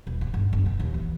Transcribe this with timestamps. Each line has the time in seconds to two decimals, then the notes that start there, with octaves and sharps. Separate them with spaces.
0.07 D#1
0.21 C#3
0.34 G1
0.53 F#1
0.66 A#2
0.80 D#2
0.94 E3